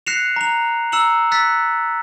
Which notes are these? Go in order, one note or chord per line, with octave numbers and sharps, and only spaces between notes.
F#6 A#6 C7 C#7 E7 F7
A#5 F7
A#5 E6 C#7 E7 F#7
E6 F#6 A6 B6 C#7